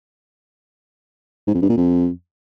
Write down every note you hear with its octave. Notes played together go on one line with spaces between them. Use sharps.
G#2
F2
G2
A#2
F2